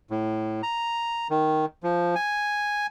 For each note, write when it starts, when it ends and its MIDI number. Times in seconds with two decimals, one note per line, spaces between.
0.11 0.62 45
0.63 1.28 82
1.30 1.65 51
1.83 2.15 53
2.15 2.87 80